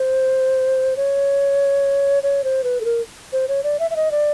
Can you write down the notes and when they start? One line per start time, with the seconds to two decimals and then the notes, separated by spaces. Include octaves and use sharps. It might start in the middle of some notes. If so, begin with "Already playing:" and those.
Already playing: C5
0.97 C#5
2.23 C#5
2.44 C5
2.64 B4
2.81 A4
2.85 A#4
3.33 C5
3.48 C#5
3.64 D5
3.79 E5
3.91 E5
3.96 D#5
4.11 D5